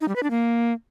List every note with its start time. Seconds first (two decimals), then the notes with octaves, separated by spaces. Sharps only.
0.01 D#4
0.08 G3
0.16 B4
0.23 D4
0.30 A#3